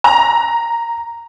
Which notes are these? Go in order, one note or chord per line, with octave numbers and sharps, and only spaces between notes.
A#5